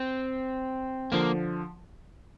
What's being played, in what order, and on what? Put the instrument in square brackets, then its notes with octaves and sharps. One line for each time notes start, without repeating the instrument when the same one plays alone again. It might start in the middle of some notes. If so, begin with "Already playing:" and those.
Already playing: [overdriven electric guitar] C4
[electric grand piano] D3 F3 [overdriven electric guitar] A#3